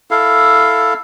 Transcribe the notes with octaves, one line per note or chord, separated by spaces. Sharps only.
E4 A4 F5